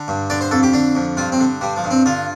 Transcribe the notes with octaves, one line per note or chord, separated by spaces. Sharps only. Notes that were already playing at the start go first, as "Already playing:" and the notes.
Already playing: D3
G2
D3 D5
C5
F2 A4
G4
D3 D4
F2
G2 F4
C4
D3
G2 G3
F3
G2
C4
D3 F4